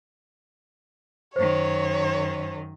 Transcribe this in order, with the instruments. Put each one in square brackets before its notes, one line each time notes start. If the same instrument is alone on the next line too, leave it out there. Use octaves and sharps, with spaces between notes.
[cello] F#2 D#3 [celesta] C5 [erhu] C#5